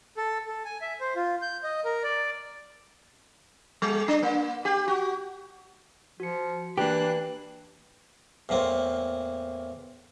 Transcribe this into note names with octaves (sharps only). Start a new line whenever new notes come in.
A4
A4
G#5
E5
C5
F4
G6
D#5
A#4
D5
G3
D4
A#3
G4
F#4
F3 F#4 C#7
E3 A#3 D4 G4 B4 G5 F#6
E2 A2 A#3 C4